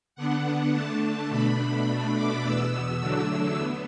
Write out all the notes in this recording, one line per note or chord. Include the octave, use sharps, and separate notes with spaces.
D3 B3 D4 F#5
D3 A3 D4 A5
B2 A3 D4 B5
B2 A3 D4
D6
E2 B2 B3 E6
E2 D3 F#3 A3 D4
B3